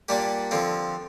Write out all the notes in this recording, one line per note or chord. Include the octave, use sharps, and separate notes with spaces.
A#2 G3 D4 G4
D3 F3 C4 F4